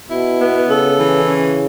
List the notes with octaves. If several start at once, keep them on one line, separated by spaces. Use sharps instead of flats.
B2 E4
B3
C#3 A4
E3
C#3 C#4